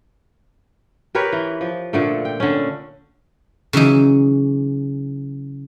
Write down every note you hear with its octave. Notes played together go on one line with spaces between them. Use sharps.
G4 A#4 B4 C#5
E3
F3
A#2 D3 A3
G5
D3 C#4
C#3 E3 F#3 D#4